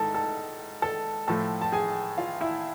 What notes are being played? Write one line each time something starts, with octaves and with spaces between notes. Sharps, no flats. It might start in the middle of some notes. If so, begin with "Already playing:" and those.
Already playing: G#2 A4 A5
A4 A5
A4 A5
A2 F3 A4 A5
A5
G#4 G#5
F4 F5
E4 E5